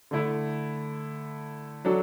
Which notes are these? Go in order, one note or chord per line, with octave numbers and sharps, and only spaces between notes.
D3 A3 E4
F#3 D4 F#4 A4